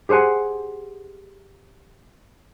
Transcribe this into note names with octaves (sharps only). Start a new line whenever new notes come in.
G4 G#4 C5 F#5 G#5